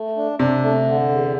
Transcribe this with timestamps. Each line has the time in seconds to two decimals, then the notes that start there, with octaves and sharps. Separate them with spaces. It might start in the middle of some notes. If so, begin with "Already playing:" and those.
Already playing: A3
0.17 D4
0.39 C3 D4
0.63 A3
0.86 D3
1.09 E2